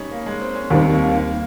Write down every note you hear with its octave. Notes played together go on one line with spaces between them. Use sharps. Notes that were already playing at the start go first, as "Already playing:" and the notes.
Already playing: G3 C#4 D#4
A#3
G#3
C4
C#4
D#2 D#3 G3 C4
A#3
A#3
A#3